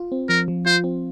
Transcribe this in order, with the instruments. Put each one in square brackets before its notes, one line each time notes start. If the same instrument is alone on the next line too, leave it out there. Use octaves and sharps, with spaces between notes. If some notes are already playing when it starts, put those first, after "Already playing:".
Already playing: [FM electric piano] F4
C4
[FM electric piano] F3 [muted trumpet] A#4
[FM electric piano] F3
[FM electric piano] F4 [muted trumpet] C5
[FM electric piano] C4